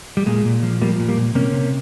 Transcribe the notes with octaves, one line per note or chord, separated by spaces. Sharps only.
G3
A#2 G#3
A#2
F3
F3 G3 A#3
A#2
G3 A#3
A#2
C3 A#3 C#4
C3